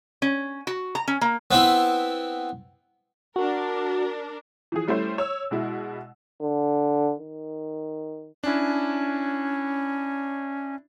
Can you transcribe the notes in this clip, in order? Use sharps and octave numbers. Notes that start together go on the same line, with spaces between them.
C#4
F#4
A#5
C#4
A#3
B3 C4 E4
D4 F#4 A#4
E3 F3 G#4
G3 A3 C#4 E4 C5
C#5 E6
B2 G#3 E4
D3
D#3
C#4 D4 E4